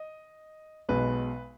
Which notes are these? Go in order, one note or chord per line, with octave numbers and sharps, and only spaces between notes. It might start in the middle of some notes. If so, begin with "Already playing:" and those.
Already playing: D#5
B1 B2 G#3 B4